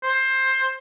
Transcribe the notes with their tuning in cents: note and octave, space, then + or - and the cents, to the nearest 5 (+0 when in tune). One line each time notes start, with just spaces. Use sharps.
C5 +15